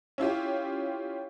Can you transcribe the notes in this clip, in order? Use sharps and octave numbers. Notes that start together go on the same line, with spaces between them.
C#4 E4 F4 G4